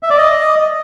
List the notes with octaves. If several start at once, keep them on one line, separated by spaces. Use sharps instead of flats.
E5
D5
D#5